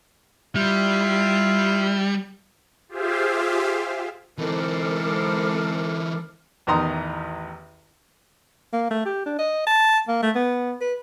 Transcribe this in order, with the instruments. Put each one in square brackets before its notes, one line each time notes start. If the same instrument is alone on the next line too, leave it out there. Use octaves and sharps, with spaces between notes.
[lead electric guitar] G3 [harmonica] E4 F4 F6
[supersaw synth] F4 G4 G#4 C5 E5 F5
[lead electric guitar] E3 D#4 [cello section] G#3 C4 A4 [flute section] A#4 D6 F6
[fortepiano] A1 E2 D#3 A#5 C6 D#6
[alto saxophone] A#3
A3
G4
D4
D#5
A5
A#3
A3
B3
B4